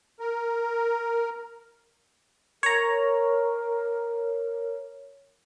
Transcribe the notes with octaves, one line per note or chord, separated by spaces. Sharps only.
A#4
A#4 C#5 A#5